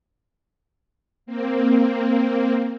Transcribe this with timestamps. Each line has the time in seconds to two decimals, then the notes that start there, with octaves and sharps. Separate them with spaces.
1.26 A#3 C4